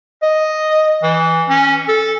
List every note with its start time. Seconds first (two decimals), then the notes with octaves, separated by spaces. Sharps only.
0.23 D#5
1.03 E3
1.49 C#4
1.88 A4